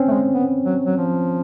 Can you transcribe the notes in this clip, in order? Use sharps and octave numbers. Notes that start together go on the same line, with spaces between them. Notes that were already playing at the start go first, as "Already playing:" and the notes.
Already playing: C4 C#4
A3
G#3
B3
F#3
F#3
F3